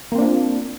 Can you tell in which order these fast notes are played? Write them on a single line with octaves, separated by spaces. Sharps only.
A#3 C4 D4 F4